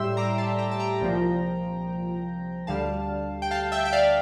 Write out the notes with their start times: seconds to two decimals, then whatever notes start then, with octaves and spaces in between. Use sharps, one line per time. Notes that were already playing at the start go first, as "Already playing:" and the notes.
Already playing: A2 G3 E5 G5 C6 E6
0.17 A#5 D6
0.38 A5 C6
0.59 G5 A#5
0.71 A5
0.79 G5 A#5
1.01 C2 A#2 F3
2.67 D2 D3 G3 F5 A5
3.42 G5
3.51 F5 A5
3.72 E5 G5
3.85 G5
3.93 D5 F5